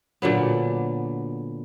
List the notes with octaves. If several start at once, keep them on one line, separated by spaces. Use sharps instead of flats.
A#2 D3 F#3 B3